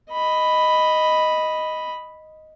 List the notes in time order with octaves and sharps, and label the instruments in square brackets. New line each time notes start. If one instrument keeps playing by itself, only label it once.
[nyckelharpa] D#5 B5